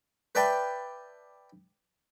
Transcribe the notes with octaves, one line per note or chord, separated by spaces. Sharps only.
B4 D5 E5 G5 A5 B5